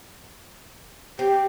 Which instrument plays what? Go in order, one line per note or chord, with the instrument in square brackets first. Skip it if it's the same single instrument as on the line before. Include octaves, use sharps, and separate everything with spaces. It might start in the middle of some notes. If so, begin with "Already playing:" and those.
[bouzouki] C4 [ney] G4